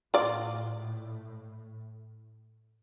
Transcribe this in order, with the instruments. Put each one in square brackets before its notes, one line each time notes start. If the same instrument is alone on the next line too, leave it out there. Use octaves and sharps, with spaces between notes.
[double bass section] A2 [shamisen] F4 D5